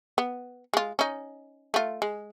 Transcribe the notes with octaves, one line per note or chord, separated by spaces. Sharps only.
B3
G#3 F4
C#4 D#4
A3 F4
G#3